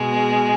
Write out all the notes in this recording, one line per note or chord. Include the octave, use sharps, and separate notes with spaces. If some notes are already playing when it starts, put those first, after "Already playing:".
Already playing: B2 G#3